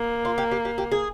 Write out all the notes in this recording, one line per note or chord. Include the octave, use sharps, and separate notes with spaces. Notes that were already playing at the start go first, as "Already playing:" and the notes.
Already playing: A#3
F4
G4
G4
G4
G4
G#4